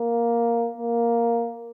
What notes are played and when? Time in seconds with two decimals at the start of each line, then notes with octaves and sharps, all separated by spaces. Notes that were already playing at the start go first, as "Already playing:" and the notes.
Already playing: A#3
0.78 A#3